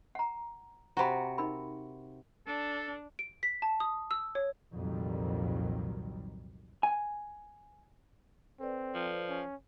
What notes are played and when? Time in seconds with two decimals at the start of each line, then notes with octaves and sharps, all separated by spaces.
0.15 F#5 A#5
0.97 C3 F#4 A#5 B5
1.38 D#4 A#4 B5
2.47 D4 A4
3.19 D7
3.43 B6
3.62 A5
3.80 D#6
4.11 E6
4.35 C#5
4.72 C2 F2 A#2 D#3 F#3 G3
6.83 G#5
8.60 C4 A4 B4 D5
8.94 F3
9.29 C#4